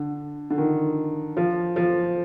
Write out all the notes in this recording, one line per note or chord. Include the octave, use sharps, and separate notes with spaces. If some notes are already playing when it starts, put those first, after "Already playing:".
Already playing: D3
D3
D#3
F3
F3